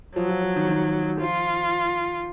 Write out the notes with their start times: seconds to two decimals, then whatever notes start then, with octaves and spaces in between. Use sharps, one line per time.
0.16 F3 F#3
0.29 F3
0.42 F3
0.56 D#3
0.69 D#3
1.21 F3 F4